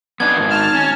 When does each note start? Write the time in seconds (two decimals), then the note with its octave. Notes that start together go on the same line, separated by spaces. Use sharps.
0.20 B3 D4 D#4 G#6
0.37 G#2 D#3
0.50 A5 F6
0.75 C#4